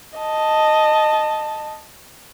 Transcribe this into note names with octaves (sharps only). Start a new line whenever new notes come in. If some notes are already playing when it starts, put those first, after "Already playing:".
D#5 A5